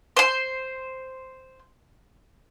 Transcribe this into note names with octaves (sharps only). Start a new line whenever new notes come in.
C5 C6